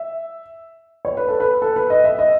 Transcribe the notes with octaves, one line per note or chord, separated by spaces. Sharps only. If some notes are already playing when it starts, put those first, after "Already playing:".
Already playing: E5
C#5
B4
A4
B4
A4
B4
D#5
E5
D#5